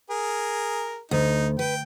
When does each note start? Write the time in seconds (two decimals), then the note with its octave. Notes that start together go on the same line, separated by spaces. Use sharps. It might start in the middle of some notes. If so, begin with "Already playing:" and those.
0.10 G#4 A#4
1.11 D2 D#4
1.59 B4 G5